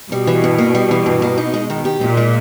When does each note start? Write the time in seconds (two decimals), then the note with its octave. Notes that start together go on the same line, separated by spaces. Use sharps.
0.11 B2 G3
0.27 E3
0.44 G2
0.58 A#3
0.75 G3
0.91 E3
1.06 G2
1.22 A#3
1.38 D#4
1.54 G#3
1.70 D#3
1.85 G4
2.01 A#2 D#4
2.17 G#3